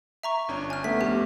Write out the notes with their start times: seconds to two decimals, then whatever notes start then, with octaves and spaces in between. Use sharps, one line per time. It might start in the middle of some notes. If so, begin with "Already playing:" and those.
0.23 E5 A#5 C#6
0.48 G1 C#4 D4
0.70 G#5 F6
0.84 A3 B3 B6
1.01 A#1 G4